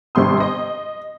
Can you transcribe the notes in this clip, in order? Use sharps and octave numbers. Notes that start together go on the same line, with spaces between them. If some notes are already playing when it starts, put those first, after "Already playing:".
G#1 G2 C3 C6 D#6
D#5